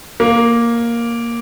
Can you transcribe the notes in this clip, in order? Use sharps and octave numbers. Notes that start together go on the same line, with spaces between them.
A#3